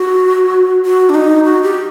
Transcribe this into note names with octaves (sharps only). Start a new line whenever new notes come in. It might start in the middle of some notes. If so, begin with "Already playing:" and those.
Already playing: F#4
F#4
D4
D#4
F#4
G4